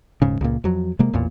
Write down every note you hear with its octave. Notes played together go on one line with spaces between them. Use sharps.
D#1 G#2 C#3
C#2 A#2
F2 F#3
C3 G#3 A#3
A1 E2 A#2